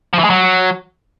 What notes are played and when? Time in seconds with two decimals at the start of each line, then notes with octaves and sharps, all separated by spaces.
0.13 F3
0.19 E3
0.24 G#3
0.30 F#3